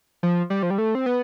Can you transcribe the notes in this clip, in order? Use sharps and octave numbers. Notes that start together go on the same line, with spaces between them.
F3
G3
F3
G3
A3
C4
B3